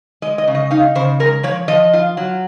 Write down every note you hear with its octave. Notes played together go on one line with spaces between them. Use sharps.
G#3 D#5
D#5
C#3
D#5
D#4 F5
C#3 C5
G#3 A#4
F3 C#5
F3 D#5
F4
F#3